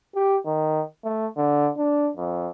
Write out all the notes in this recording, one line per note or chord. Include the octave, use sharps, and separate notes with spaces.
G4
D#3
A3
D3
D4
F2